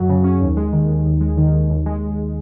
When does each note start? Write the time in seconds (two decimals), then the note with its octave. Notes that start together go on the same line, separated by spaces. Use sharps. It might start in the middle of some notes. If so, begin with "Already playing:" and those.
Already playing: F#2 F#3
0.09 C#3
0.24 C#4
0.41 D#2
0.57 G#3
0.73 D#3
0.89 D#2
1.05 D#2
1.20 G#3
1.37 D#3
1.53 D#2
1.70 D#2
1.86 G#3